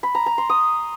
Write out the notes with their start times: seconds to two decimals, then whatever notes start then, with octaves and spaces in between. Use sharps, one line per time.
0.03 B5
0.15 A#5
0.26 A#5
0.38 C6
0.50 D#6